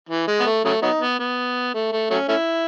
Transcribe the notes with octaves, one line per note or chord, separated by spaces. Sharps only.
E3
G#3
B3
A3
C#3 F#3 A3
F#3 B3 D#4
B3
B3
A3
A3
F#3 A3 C#4
A3 C#4 E4